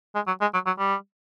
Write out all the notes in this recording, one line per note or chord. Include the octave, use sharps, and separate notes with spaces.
G#3
F#3
G#3
F#3
F#3
G3